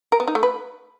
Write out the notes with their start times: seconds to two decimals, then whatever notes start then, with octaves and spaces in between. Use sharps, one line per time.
0.12 A#4
0.20 B3
0.27 D#4
0.35 A3
0.43 B4